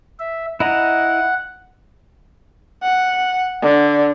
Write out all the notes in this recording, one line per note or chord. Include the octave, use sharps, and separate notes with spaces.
E5
E4 D#5 F#5 A#5
F#5
D3